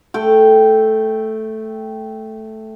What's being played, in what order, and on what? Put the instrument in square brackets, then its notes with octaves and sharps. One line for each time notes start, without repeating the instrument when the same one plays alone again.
[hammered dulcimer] A3 G5